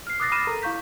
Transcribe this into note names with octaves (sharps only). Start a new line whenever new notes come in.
F6 C7
D6 D#6 F#6 A6 A#6 C7
B5 D6 F6 A#6 D#7 E7
A4 A#4 A#5
E4 F5 C#6 G6 B6